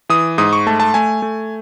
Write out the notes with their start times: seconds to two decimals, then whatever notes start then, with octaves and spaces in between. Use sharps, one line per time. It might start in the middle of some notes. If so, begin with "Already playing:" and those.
0.10 E3 D#6
0.38 G#2 D#6
0.53 C#6
0.67 A3 A5
0.80 A5
0.94 A3 G#5
1.22 A3